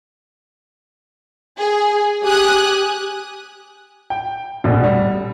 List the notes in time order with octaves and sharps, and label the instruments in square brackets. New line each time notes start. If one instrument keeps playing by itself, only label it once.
[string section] G#4
G4 G#5 D#6 F#6
[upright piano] G5
F1 A#1 B2 D4
G3